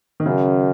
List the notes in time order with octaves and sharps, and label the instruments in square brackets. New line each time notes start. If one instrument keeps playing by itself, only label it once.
[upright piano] D#3
[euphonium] F#2 [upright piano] C#3